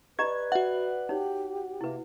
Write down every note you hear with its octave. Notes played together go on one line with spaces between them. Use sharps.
G4 B4 D5 D#5 A#5 G#6
F#4 E5 F#5
D#4 G4 C#5
C3 A#3 E4 B4